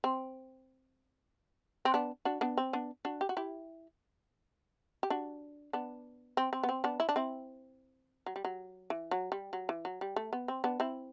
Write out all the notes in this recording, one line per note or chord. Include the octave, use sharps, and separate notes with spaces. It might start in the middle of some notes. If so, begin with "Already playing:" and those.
C4
C4
B3 D4
D4 F#4
B3 D4
C4
B3 D4
D4 F#4
G4
F#4
E4 G4
G4
D4 F#4
B3 D4
C4
C4
B3
C4
B3 D4
E4
D4
C4 E4
F#3
G3
F#3
E3
F#3
G3
F#3
E3
F#3
G3
A3
B3
C4
B3 D4
C4 E4